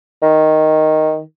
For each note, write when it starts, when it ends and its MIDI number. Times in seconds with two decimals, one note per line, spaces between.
0.22 1.20 51